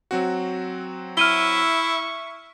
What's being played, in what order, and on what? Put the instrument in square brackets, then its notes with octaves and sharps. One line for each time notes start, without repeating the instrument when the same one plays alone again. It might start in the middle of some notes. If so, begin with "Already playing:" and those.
[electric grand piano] F#3 C4 F#4
[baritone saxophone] E4 [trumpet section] E5 C#6 [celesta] F6 D#7 G7